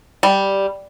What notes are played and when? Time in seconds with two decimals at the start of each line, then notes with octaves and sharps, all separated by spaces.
0.23 G3